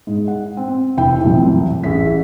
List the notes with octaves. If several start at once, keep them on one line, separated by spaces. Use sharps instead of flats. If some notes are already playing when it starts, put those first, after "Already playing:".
G#2
F#5
C4
F1 C4 E4 G5
C2 F#2 A2 C3 E3 F3
A1 G#4 E5 B6